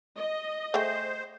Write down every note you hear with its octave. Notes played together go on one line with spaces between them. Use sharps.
D#5
A3 G#4 C5 G5